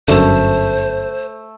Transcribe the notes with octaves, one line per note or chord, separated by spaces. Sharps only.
G1 F#2 D3 A3 C5